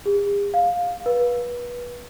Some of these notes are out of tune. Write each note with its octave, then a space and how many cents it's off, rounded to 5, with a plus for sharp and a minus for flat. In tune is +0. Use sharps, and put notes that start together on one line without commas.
G#4 -45
F5 +15
B4 -30